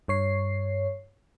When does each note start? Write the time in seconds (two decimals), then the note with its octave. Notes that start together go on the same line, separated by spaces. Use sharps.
0.08 G2 C#5 C7